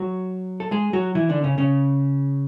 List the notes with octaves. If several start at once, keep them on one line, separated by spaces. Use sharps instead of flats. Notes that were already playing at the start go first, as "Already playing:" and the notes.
Already playing: F#3 F#4
A4
G#3 G#4
F#3 F#4
E3 E4
D3 D4
C#3 C#4
C#3 C#4